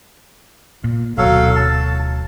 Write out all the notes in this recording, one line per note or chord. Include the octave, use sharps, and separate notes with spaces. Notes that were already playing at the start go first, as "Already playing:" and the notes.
A#2
D1 B2 F#3 A4 F5
A5